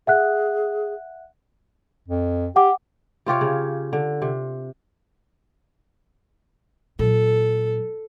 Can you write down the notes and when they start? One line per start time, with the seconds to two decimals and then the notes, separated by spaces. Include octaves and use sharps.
0.07 G#4 E5 F#5 F#6
2.08 F2
2.56 G4 F#5 D6
3.26 C3 F4 G4 C#5
3.41 C#3
3.93 D3
4.22 C3
6.99 A#2 F#3 A4